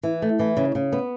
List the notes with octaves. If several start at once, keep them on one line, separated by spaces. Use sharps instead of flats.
E3
A3
E3
C#3
C#3
B3